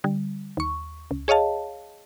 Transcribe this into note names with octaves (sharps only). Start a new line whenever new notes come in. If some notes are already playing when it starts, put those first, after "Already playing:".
D3 G3
D#2 C#6
C#2
G#4 C#5 D#5 F5 A5